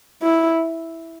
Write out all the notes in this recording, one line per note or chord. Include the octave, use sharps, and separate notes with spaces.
E4